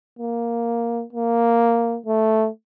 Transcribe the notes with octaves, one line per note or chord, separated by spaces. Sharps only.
A#3
A#3
A3